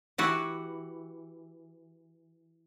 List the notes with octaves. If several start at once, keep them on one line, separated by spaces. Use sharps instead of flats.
E3 F#4 G4